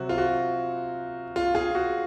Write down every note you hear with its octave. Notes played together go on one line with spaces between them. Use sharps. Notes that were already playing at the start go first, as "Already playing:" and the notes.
Already playing: C3 F#3 C4 F#4
F4
F#4
F4
F4 G#4
F#4